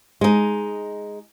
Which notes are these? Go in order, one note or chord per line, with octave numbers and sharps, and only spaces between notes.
G#3 D#4